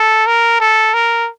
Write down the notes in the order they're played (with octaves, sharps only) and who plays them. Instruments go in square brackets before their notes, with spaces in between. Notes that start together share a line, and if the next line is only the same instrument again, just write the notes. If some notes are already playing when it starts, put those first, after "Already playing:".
Already playing: [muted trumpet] A4
A#4
A4
A#4